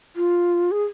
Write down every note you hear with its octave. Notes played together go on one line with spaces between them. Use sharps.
F4
G#4